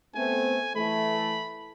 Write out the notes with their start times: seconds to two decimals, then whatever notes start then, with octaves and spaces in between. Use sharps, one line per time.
0.15 A3 B3 C4 G#5
0.76 E3 A3 B5